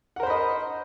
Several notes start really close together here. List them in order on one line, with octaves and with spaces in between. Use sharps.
F#5 A#4 C5 B5 D#5